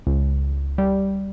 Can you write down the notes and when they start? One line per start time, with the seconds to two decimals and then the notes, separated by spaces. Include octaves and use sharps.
0.07 C#2
0.78 G3